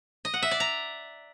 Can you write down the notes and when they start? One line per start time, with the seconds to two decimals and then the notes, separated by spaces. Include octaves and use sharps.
0.25 D#5
0.34 F#5
0.42 E5
0.51 D5
0.60 A#5